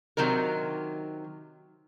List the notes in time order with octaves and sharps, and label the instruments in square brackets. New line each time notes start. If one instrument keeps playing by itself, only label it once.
[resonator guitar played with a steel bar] C3 D#3 F#3 D#4 A#4